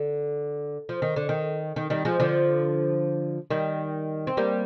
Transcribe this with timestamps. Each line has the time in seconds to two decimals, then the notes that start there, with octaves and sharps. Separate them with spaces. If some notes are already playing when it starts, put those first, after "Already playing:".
Already playing: D3
0.89 F3
1.02 D#3
1.16 D3
1.29 D#3
1.76 D#3
1.90 D#3 G3
2.05 F3 G#3
2.20 D3 F3
3.50 D#3 G3
4.27 C4
4.37 G3 A#3